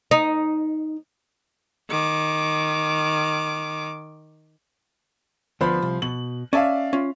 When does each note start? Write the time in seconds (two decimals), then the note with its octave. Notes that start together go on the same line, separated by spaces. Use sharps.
0.11 D#4
1.90 D#3 D6
5.61 D2 F3 B3 C5 B5
5.82 C2
6.02 B2 F#7
6.53 C#4 D5 E5 F5 G#5 A5
6.93 C#4 F4